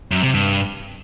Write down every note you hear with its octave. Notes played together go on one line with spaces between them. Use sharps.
F#2
C3
G2